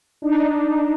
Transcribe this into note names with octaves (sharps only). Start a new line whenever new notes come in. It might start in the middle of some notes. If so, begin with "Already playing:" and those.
D4 D#4